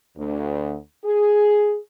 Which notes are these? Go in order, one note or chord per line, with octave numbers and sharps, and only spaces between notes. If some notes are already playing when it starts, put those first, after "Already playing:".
D2
G#4